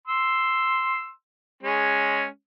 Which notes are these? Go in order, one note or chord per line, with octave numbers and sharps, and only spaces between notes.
C6 E6
G#3 C#4